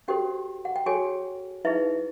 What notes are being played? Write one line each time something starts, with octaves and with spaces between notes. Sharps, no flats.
C#4 F#4 G4 A4 C5 G5
F#5
G5
F#4 G#4 A4 C#5 G#5
D#4 E4 G#4 B4 E5